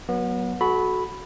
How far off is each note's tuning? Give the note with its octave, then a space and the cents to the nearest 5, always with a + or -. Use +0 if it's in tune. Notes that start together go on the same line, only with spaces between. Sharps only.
F#3 +0 B3 -30
F#4 +0 A4 -30 B5 +0